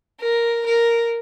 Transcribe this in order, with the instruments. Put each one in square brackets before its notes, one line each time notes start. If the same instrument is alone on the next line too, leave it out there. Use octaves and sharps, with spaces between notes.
[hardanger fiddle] A#4
A#4